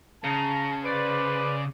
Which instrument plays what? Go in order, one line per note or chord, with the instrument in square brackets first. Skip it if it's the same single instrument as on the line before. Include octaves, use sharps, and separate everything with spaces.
[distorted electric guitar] C#3 [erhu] A5 [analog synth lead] A#5
[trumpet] B4 [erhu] C5 [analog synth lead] D5